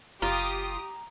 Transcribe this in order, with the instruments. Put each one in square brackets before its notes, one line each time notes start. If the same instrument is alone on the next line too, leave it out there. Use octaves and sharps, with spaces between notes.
[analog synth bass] F#1 [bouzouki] F4 [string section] G4 D#6 [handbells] A#5